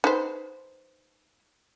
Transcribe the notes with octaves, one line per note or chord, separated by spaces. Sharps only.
D#4 B4 C5